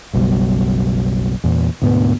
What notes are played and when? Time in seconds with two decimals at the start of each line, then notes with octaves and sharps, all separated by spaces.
0.13 F#1 B1 B2 G3
1.44 E2 A#2
1.82 D2 G#2 B2 B3